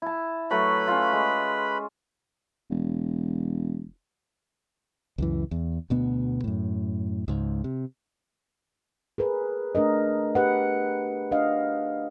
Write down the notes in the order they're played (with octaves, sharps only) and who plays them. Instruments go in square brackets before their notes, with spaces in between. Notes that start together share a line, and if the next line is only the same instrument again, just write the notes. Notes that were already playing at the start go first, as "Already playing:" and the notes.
[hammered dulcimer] E4 A5
[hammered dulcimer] F#3 A3 [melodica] B4 B5
[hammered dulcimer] C#4 F4
G#3
[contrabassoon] E1
[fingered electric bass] C#2 F#2 E3
E2
D2 B2 B3
F#2 A2
C#2 G#2
C3
[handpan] G#4 A#4 B4
A3 D4 A#4 D#5
G4 B4 F#5
D4 D#5 F5